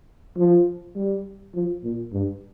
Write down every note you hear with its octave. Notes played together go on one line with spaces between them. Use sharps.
F3
G3
F3
A#2
G2